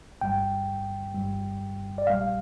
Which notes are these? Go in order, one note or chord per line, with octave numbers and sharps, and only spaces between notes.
G1 G2 G3 G5
G1 G2 G3
D5
A#1 A#2 G3 F5